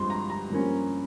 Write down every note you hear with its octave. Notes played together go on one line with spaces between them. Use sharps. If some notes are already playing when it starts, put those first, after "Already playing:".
Already playing: G2 F3 G#3 C4 C6
A#5
A#5
G2 F3 A#3 C#4